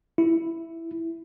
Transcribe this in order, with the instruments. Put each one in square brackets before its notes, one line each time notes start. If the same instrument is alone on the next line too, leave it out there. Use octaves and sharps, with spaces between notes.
[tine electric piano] E4